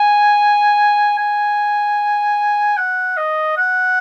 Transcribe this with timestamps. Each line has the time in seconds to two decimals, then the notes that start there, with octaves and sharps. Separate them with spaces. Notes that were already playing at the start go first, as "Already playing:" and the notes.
Already playing: G#5
1.18 G#5
2.77 F#5
3.17 D#5
3.57 F#5